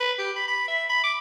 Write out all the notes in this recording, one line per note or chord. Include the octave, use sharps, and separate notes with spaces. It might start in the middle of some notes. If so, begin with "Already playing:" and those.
B4
G4
B5
B5
E5
B5
D6